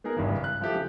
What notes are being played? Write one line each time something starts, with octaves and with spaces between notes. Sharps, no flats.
B3 D#4 G#4 A#4
G#1 G2 C#3 E3
F#6
F3 E4 G4 A4
C#3